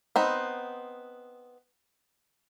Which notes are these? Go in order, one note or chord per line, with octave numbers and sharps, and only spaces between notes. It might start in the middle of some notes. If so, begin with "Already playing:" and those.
B3 C4 D#4